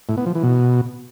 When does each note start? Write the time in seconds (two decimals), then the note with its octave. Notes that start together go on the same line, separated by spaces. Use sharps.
0.09 A2
0.17 B3
0.26 F3
0.35 E3
0.44 B2